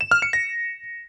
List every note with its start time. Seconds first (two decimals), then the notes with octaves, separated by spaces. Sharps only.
0.01 E7
0.11 F6
0.22 C#7
0.33 A#6